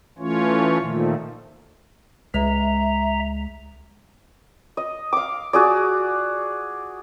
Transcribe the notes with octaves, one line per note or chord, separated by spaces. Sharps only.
E3 A3 C#4 F4 C#5
A#2 D#3 F3 A3
C#2 G#3 E5 A#5
D#5
F5 D6
F#4 G#4 D5